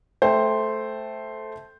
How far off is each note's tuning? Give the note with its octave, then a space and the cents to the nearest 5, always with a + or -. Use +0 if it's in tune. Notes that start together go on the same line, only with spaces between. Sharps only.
A3 -5 C5 +0 G5 +0